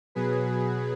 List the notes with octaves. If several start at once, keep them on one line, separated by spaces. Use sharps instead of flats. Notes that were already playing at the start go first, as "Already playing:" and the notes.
B2 F#3 G#4 B4